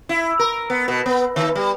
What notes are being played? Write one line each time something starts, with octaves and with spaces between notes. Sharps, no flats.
E4
A#4
B3
B2
B3
D#3
G3